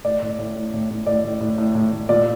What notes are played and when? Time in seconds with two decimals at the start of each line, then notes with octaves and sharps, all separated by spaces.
0.04 A2 D5
0.22 A2
0.39 A2
0.56 A2
0.74 A2
0.90 A2
1.06 A2 D5
1.24 A2
1.41 A2
1.58 A2
1.75 A2
1.92 A2
2.09 A#2 D5